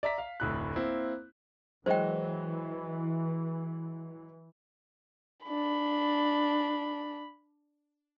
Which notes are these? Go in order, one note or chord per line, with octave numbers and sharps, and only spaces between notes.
D5 E5 A#5 B6
F5
F1 D2 A2 F#6
A#3 C4 E4
E3 F#3 G#3 F#4 C5 G5
D4 B5